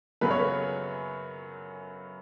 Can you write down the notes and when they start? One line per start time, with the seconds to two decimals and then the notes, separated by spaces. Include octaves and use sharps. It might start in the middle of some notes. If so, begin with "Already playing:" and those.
0.21 F#2 C#3 F#3 B3 B4
0.31 C#5
0.39 B4